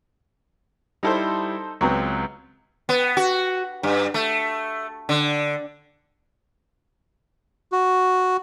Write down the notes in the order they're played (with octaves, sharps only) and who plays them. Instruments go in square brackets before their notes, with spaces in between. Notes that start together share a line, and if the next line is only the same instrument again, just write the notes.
[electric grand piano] G3 E4 [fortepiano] D#4 A4 C5
[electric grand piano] C#2 [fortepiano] F#3 B3 C4
[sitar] B3
F#4
G2
A3
D3
[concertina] F#4